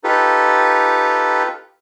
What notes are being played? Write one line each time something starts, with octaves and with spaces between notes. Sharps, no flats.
D#4 F4 G4 A4 B4